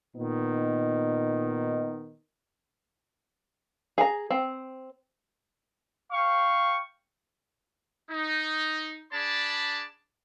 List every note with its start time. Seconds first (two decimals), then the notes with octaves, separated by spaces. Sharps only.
0.17 A#2 D#3 B3 D#4
3.98 G#4 A#5
4.31 C4
6.12 F5 G5 C#6
8.10 D#4
9.13 D4 G#4 D5 A5 B5